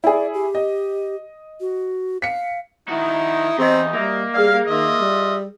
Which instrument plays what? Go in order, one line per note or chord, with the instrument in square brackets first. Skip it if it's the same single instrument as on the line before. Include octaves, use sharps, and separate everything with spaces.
[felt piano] E4 G#4 [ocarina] D5
[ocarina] G4
[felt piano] D#5
[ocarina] F#4
[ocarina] F5 [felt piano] B6 C#7
[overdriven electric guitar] D#3 F#4 [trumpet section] D#4 [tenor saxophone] E4
[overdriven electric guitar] E2 [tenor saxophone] C4 [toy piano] G4 D#5
[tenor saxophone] G3 [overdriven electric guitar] A#3 [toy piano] F#4 A#4 E5
[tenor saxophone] G3 [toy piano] G#4 A#4 D5 [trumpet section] F5
[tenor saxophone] D#3 [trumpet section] F4 D#5 E5
[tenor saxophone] G3